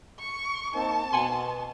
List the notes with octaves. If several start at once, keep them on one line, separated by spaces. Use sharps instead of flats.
C#6
A#3 C4 D#4 A5
B2 F#5 G#5 C6